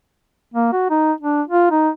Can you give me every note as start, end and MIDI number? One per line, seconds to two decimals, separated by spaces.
0.54 0.70 58
0.72 0.86 66
0.90 1.12 63
1.21 1.42 62
1.47 1.70 65
1.71 1.89 63